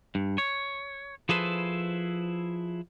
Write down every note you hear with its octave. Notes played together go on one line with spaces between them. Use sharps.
G2
C#5
F3 E4 G#4 A4 B4 C5